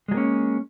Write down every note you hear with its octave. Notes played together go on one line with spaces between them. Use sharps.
F#3 G#3 A#3 C#4